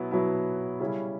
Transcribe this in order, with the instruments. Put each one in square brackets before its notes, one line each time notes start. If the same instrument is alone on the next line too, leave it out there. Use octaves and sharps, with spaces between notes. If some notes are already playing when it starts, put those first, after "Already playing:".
Already playing: [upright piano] B2 F#3 B3 E4
B2 F#3 B3 E4
C#3 G3 C#4 E4